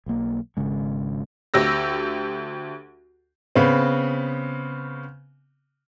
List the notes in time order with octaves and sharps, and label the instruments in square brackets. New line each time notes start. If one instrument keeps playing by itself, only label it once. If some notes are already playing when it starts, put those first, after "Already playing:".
[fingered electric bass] B1 A#3
G#1 C#3 G#3
[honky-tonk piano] D2 G4 E6 A#6
[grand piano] C#3 B3 C4